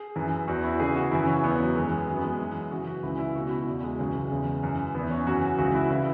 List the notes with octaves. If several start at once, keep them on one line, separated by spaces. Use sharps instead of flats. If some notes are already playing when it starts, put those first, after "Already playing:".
Already playing: G#4
F#2 E3
E2 E3 F#4
E4
E2 C#3 E3 G#4
F#4
F#2 C#3 E3 E4
C#4
E2 E3 B3
F#3
F#2 E3 G#3
F#2 E3 F#3
B3
G#3
F#2 E3
F#2 C#3 E3 F#4
F#4
C#2 C#3 E3 E4
E4
C#2 B2 F#4
F#4
E4
E2 B2
G#3
C#2 C#3 E3 F#3
G#3
E2 C#3 E3
F#2 E3
E2 E3 B3
C#4
F#2 C#3 E3 F#4
C#2 C#3 E3 F#4
E4
C#3 E3 E4